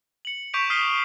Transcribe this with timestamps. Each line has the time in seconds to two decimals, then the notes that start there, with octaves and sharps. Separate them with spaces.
0.25 C#7 F#7
0.53 C#6 D6 G6 B6 D7 F7
0.70 D#6 F6 B6 C7 D#7 G7